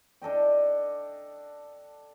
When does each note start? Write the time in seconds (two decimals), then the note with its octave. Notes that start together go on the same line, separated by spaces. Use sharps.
0.22 D4 A4 D#5 G5